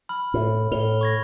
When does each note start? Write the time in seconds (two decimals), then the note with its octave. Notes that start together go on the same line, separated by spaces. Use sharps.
0.09 B5 F6
0.34 A2
0.72 A2 F6 F7 G7
1.01 C#6 G#6 A#6